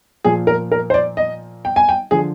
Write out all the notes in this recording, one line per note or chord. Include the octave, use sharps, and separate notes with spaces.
A#2 F3 G#4
A#4
A#4
C5
D5
D#5
G5
G#5
G5
D3 F3 G#4